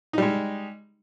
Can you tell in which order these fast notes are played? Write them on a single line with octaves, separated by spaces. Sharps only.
D#4 G3 G#3